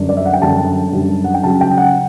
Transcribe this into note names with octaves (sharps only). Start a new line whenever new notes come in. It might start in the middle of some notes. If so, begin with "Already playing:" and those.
Already playing: F#2 D3 G3 D4
D5
E5
F#5
G5
F#2 D3 G3 D4 A5
F#2 D3 G3 D4
F#5
G5
C#3 F#3 C#4 A5
G5
F#5